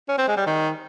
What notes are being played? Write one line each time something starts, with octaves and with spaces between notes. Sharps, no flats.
C#4
C4
G#3
G3
D#3